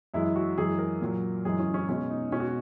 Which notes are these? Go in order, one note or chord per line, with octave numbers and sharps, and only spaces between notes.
F#2 E3 G#3 E4
F#4
F#2 E3 G#3 G#4
A#4
A#2 F#3
F#2 E3 G#3 G#4
C#4
C#4
B2 G#3 C#4
D#4
B2 G#3 C#4
F#4